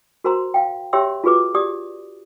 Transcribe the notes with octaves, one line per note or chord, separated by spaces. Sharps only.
F#4 A#4 C5 A#5 C6
F5 G5
G4 C#5 E5 G5 C6 E6
F4 F#4 G#4 B4 D6
G4 D5 D#6